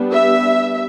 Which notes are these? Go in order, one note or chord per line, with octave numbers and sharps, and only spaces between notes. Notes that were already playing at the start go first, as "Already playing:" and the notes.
Already playing: G3 B3 D4
E5